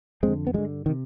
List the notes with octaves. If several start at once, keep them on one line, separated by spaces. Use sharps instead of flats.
F2 G#3 C4
D3
B3
G2 D3 F3 G#3
D#3
C3